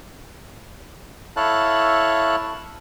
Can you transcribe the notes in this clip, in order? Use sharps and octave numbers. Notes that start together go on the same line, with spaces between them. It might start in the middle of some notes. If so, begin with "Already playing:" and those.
E4 A4 C#5 F5 A5 F#6